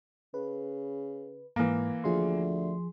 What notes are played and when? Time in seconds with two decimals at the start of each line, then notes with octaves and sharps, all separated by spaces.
0.34 C#3 B4
1.56 G#2 E3 A#3
2.04 D2 F3 G#4 C6